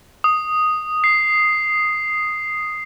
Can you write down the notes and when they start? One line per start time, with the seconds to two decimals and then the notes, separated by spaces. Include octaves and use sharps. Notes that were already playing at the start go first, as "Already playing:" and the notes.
0.24 D#6
1.04 C7